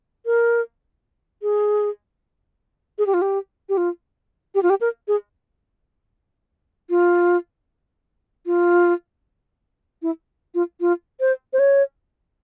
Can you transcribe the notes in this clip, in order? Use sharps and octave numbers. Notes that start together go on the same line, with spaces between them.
A#4
G#4
G#4
G4
F4
G4
G4
F4
G4
F4
G4
A#4
G#4
F4
F4
E4
F4
F4
C5
C5
C#5